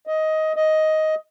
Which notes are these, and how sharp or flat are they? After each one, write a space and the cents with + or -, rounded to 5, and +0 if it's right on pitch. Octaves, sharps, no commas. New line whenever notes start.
D#5 +15
D#5 +10